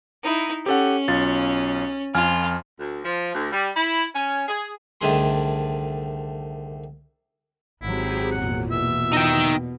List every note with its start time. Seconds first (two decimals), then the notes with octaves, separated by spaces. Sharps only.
0.23 D#4 E4
0.66 C#4 G4 A4 F#5
1.08 B1 F4 A6
2.15 F2 F4 G#5 F6
2.79 D2
3.04 F3
3.34 D2
3.52 G3
3.76 E4
4.14 C#4
4.48 G#4
5.01 C2 D3 D#3 A3 G#4 C6
7.82 G#1 F#3 C4 E4 G4 G#4
8.31 E2 A#2 F#5
8.72 B2 E5
9.13 D#4 G5